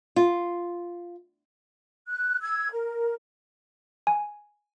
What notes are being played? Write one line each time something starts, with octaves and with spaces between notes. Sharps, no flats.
F4
F#6
E6 G#6
A#4
G#5